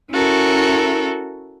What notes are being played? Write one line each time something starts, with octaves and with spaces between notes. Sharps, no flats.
C#4 E4 F#4 A4 A#4